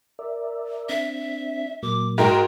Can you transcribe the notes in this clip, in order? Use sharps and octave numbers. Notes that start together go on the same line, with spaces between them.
A#4 D5 E5
C4 D4 E5
A#2 F#3 A#3 D6
G#2 F#4 A#4 G5